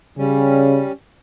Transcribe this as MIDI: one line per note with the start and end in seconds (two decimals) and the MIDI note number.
0.18 0.83 49
0.18 0.92 55
0.18 0.92 61